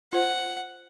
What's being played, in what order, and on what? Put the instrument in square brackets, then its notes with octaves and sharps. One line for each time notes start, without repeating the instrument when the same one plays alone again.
[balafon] F4 C5 [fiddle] F#5